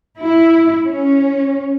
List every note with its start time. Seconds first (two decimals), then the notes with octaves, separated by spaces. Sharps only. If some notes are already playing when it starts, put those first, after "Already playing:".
0.19 E4
0.84 C#4